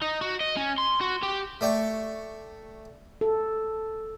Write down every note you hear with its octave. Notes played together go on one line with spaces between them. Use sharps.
D#4
F#4
D#5
C#4
C6
F#4
G4
A3 D5 G5 C#6
A4